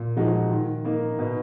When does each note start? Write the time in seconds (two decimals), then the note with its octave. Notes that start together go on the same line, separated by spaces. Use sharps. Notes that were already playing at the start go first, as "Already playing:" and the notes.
Already playing: A#2
0.16 F3 G#3 D#4 F#4
0.50 D#3
0.85 A#3 D#4
1.19 B2